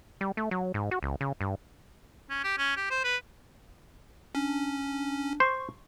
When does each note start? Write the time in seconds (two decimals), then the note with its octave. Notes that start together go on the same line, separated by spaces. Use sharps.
0.21 G3
0.37 A3
0.51 F#3
0.74 G#2
0.91 F#4
1.03 C#2
1.21 C#3
1.41 G2
2.30 C#4
2.44 G4
2.58 C#4
2.76 G4
2.90 C5
3.04 B4
4.35 C#4 D4
5.40 C5 C#6